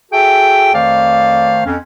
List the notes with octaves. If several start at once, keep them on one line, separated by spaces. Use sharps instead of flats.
F#4 G#4 A4 E5 G5
F2 D#3 A3 C5 D5 F5
F2 C#4